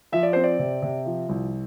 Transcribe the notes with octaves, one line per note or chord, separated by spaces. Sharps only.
F3 E5
D5
C4 C5
D5
C3
C3
F3
C2